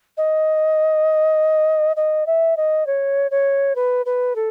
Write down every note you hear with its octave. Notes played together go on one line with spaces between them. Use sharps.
D#5
D#5
E5
D#5
C#5
C#5
B4
B4
A4